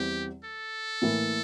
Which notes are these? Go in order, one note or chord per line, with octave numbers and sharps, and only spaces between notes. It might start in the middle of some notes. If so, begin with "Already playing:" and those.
Already playing: E2 E3 G3 C4 G4
A4
A2 E3 A#3